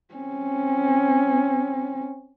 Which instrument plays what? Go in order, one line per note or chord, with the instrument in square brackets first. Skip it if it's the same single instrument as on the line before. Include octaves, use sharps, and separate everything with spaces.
[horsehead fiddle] C4 C#4